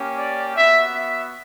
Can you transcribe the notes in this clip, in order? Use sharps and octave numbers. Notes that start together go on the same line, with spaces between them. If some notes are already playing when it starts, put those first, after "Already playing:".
Already playing: A#3 C#4 G4
D5
B3 F#4 E5
E5